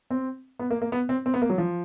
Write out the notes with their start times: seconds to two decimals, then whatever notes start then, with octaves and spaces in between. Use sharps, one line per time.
0.11 C4
0.59 B3
0.71 A#3
0.82 A#3
0.92 B3
1.09 C4
1.26 C4
1.34 B3
1.42 A#3
1.50 F#3
1.58 F3